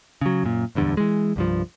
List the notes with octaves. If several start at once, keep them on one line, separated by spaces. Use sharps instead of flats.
C#3 F#3
F#2 A#2
D1 E2 G2 D3
E3 G#3
C2 G2 F3